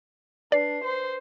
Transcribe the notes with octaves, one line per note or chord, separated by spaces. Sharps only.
D4 B4 D5 C7
C5